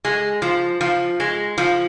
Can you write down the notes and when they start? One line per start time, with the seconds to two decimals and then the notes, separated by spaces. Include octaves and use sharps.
0.05 G#3
0.42 F3
0.81 F3
1.20 G#3
1.58 F3